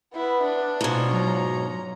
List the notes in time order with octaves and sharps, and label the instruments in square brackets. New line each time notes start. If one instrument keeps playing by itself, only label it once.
[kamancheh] B3 B4 [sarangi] E4
[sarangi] D4
[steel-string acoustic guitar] G#2 B2 [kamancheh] F4 C#5
[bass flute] F#3 [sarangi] A#5